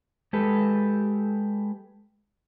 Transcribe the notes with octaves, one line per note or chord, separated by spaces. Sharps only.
G#3 G4 A4 B4